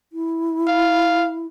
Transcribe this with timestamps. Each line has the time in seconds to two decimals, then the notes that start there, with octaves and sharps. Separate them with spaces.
0.13 E4
0.68 F5